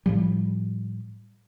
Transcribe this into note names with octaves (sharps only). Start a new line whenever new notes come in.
A2 F3 G3